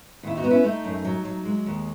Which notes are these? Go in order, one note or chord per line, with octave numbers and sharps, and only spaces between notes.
D#2 E4
D#4 F#4
B3
C#4 E4
A3 D#4
F#2
F#3
F#3
G#3
D#2